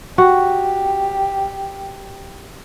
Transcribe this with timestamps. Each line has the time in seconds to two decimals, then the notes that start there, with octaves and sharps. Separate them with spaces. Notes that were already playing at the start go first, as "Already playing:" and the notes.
0.18 F#4 G4